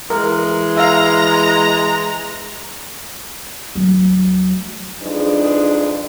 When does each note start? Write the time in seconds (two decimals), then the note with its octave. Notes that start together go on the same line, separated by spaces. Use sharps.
0.10 E3 G#3 A#4
0.77 E5 F5 A#5
3.75 D2 F#3
5.02 F2 G#3 D4 D#4 G#4 B4